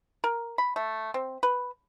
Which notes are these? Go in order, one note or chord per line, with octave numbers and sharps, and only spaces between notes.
A#4
B5
A3
C4
B4